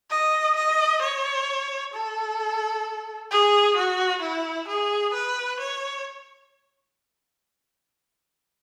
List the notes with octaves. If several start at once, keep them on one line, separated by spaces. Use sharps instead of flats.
D#5
D#5
C#5
A4
G#4
F#4
E4
G#4
B4
C#5